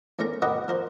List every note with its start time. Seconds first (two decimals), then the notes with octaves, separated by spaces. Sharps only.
0.19 E2 A3 C#4 A#4 A#5
0.42 F#4 G4 A#4 B4 D#5 F#5
0.68 F3 A#4 C5